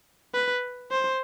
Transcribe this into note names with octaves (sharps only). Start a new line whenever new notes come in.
B4
C5